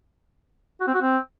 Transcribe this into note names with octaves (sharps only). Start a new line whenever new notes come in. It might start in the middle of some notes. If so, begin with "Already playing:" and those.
F#4
C4
F#4
C4